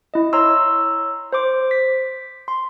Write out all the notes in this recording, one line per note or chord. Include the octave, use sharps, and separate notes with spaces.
E4 D#5
C#5 A#5 C6 E6
C5 C6 D6
B6
C6